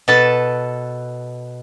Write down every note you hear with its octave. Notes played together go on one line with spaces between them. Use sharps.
B2 A4 B4 A5